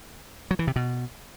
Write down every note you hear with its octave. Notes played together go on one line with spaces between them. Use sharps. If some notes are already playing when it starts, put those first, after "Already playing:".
F#3
E3
C3
B2